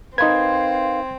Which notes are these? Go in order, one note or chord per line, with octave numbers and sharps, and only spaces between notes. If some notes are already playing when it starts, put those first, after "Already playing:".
C4 D#4 A#4 B4 F5 C6 G#6